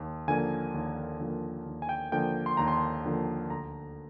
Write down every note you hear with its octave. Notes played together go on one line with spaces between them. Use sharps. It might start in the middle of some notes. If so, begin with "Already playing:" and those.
Already playing: D#2
D3 F3 A#3 G#5
D#2
D3 F3 A#3
D#2
G#5
G5
D3 F3 A#3 G5
C6
D#2 A#5
C6
D3 F3 A#3
D2 A#5